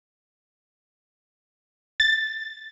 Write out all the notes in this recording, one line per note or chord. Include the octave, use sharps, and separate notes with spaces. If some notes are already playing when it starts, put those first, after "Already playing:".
A6